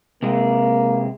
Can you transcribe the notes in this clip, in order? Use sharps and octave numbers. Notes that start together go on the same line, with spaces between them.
C3 G#3 A#3